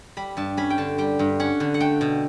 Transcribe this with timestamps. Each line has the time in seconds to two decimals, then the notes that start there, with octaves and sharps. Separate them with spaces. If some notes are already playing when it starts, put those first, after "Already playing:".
0.17 G3 B5
0.37 G2 A5
0.57 C#4 B5
0.70 G5
0.78 D3 A5
0.98 G3 G5
1.19 G2
1.40 C#4 F#5
1.60 D3
1.74 F#5
1.80 A3 G5
2.01 B2